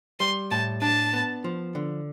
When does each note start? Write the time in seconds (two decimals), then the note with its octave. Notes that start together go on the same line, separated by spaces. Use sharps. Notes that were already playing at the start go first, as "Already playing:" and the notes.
0.20 G3 C6
0.51 A2 A5
0.82 D4 A5
1.14 B3
1.44 F3
1.75 D3